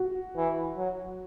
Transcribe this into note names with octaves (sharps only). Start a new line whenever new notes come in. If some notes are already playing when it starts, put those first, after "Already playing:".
Already playing: F#4
E3
F#3